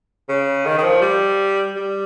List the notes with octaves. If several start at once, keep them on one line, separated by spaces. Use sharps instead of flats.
C#3
D#3
D#3
F3
G3
G3